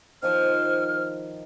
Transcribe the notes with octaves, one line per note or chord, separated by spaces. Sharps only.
D#3 F3 C5 D6 F6